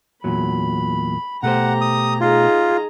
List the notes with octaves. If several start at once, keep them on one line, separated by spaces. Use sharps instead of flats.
E2 A#2 F#3 B5
B2 A3 G4 C5 F#5 A#5
D#6
D#4 F4 G#4 A#5